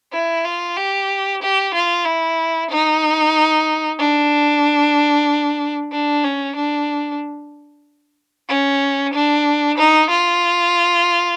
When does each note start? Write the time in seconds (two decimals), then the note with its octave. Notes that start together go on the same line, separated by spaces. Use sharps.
0.13 E4
0.45 F4
0.77 G4
1.42 G4
1.74 F4
2.05 E4
2.71 D#4
3.99 D4
5.92 D4
6.24 C#4
6.56 D4
8.49 C#4
9.14 D4
9.78 D#4
10.10 F4